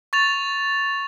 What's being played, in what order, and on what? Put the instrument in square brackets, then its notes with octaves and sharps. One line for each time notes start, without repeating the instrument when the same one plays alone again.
[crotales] C#6 A6 F7